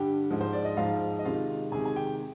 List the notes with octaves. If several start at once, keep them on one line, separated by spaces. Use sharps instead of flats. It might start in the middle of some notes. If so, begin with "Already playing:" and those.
Already playing: G2 D3 G3 G4 G5
G#2 F3 G#3
C5
D5
D#5
G#2 F3 G#3 F4 F5
D#5
C3 D#3 G#3 F4 F5
C3 D#3 G#3 G#4 G#5
G#5
G4 G5